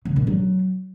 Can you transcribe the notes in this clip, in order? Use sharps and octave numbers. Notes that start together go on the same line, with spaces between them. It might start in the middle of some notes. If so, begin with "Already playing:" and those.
C#3
A#2
F#3